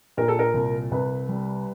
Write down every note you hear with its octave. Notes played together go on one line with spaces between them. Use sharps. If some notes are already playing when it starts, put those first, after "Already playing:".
A#2 A#4
A4
A#4
C2
C2 B4
G3